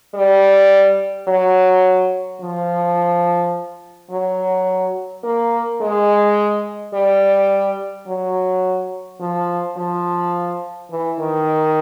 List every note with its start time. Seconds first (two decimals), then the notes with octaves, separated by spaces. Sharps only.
0.14 G3
1.28 F#3
2.42 F3
4.10 F#3
5.24 A#3
5.81 G#3
6.94 G3
8.07 F#3
9.20 F3
9.77 F3
10.91 E3
11.19 D#3